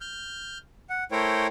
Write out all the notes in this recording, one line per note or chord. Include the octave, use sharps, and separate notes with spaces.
F6 G6
F#5
A3 E4 A#4 C5 C#5 G5